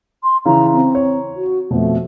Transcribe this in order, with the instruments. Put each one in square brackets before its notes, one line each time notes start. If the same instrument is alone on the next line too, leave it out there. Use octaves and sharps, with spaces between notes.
[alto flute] C6
[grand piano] C#3 E3 [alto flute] A#5
[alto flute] C4
[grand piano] C#5
[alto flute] F#4
[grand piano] F2 B2 [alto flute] A3